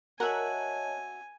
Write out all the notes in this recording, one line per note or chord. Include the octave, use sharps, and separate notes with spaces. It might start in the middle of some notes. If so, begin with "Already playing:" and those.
F#4 A#4 C#5 D#5 E5 G#5 A5 F#6